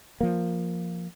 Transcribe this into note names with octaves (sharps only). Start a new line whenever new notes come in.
F3 A#3